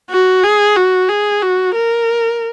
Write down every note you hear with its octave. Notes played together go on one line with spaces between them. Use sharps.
F#4
G#4
F#4
G#4
F#4
A#4